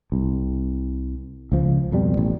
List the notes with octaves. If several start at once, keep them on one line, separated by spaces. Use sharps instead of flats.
C2
C#2 F3
F2 B2 G3
A1